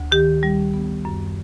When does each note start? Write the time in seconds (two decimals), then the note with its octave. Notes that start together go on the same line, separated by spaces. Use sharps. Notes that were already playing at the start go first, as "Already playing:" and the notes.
Already playing: D2
0.12 D#3 G4
0.43 G3
0.74 B3
1.05 F#2